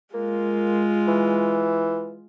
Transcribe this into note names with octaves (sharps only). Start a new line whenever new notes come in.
G#3 A#3 F4
E3